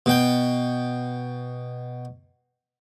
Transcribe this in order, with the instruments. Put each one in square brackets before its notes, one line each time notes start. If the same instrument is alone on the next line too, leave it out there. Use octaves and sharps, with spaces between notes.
[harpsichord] B2 G5